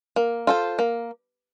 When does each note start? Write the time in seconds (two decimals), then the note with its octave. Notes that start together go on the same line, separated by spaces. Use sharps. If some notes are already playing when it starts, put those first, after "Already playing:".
0.16 A#3
0.47 F4 A4 C5
0.79 A#3